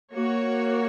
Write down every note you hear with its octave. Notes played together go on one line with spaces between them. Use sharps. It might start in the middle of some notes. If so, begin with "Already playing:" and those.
A#3 F#4 C#5